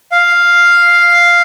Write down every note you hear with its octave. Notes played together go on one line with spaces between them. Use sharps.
F5